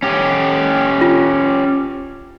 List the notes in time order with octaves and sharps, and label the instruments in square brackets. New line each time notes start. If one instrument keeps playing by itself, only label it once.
[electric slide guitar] C#4 G4
[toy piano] F4